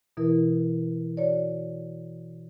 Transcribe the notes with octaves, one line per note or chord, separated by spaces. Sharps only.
B2 E3 E4 A#4
F#4 C#5 D5